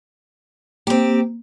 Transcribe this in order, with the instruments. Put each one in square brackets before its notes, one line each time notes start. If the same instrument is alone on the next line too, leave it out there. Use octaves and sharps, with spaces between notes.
[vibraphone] A#3 [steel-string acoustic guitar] C4 G4